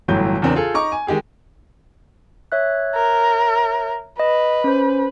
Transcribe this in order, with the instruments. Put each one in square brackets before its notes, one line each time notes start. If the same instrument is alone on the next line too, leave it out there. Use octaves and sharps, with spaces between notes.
[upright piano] G1 A2 E3 F#3 G6
E2 C#3 C4 D4 A#4
F4 G#4 A4
D#4 A#5 C#6 D6
G#5
D#3 G#3 G4 G#4
[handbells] C#5 E5 F#6
[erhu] A#4
[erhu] B4 [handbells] D#5
[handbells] C#4 C5